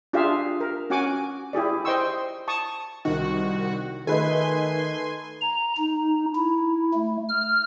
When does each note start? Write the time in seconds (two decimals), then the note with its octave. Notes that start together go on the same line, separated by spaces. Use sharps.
0.13 D4 F4 G4 G#4 E5 F5
0.60 A#4
0.90 C#4 F#4 F#5 G#5 D6
1.53 E4 G4 G#4 D5
1.85 C5 D#5 G5 C6 C#6 E6
2.48 A5 C#6 D#6
3.05 C2 D#3 F#4
4.07 D#3 A3 B4 D#5 G#5 C6
5.41 A#5
5.78 D#4
6.35 E4
6.94 A3
7.28 F6